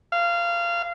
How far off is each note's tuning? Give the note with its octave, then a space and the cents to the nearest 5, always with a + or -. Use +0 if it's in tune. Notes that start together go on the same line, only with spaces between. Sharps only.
F5 -20